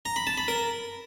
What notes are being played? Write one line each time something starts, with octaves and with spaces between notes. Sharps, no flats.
A#5
B5
A5
B5
A#4